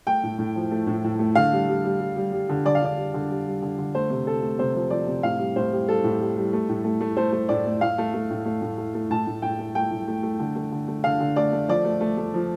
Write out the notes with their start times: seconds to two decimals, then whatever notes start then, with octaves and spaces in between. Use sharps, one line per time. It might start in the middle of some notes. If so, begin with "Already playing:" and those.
0.07 A3 G5
0.23 A2
0.39 A2
0.56 F3
0.71 A3
0.87 A2
1.04 A2
1.19 A3
1.35 D3 F5
1.53 G3
1.69 G3
1.84 G3
2.00 G3
2.16 G3
2.32 G3
2.49 D3
2.65 D3 D5
2.75 F5
2.82 D3 D5
2.97 G3
3.14 D3
3.30 G3
3.46 G3
3.62 D3
3.78 D3
3.95 A3 C5
4.10 C3
4.27 C3 A4
4.43 A3
4.59 C3 C5
4.75 F3
4.90 F3 D5
5.07 C3
5.23 A2 F5
5.39 G3
5.56 A2 C5
5.72 G3
5.88 G3 A4
6.04 A2
6.20 G3
6.37 G3
6.53 A3
6.69 A2
6.84 A3
7.01 A3
7.17 A3 C5
7.33 A3
7.49 A2 D5
7.66 A3
7.81 A2 F5
7.98 A3
8.14 A3
8.31 A2
8.45 A3
8.62 A2
8.78 A3
8.94 A3
9.10 A2 A5
9.27 A2
9.42 A2 G5
9.59 A3
9.75 A3 G5
9.91 A2
10.08 A3
10.23 A3
10.39 D3
10.56 A3
10.72 D3
10.88 A3
11.04 D3 F5
11.20 D3
11.36 A3 D5
11.52 A3
11.68 F3 D5
11.85 A3
12.01 A3
12.17 A3
12.34 F3